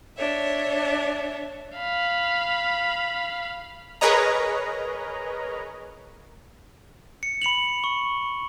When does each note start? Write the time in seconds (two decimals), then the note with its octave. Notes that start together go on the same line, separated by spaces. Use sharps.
0.17 D4 C#5 E5
1.77 F5 B5
4.01 G#4 A#4 B4 C#5 D#5 A#5
7.23 C#7
7.42 B5 C#7 F7 F#7
7.84 C#6